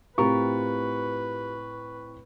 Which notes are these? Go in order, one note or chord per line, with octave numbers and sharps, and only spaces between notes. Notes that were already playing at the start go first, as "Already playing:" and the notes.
A2 C4 F4 G4 A#4 B4 C#6